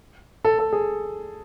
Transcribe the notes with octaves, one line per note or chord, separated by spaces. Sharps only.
A4
A4
G#4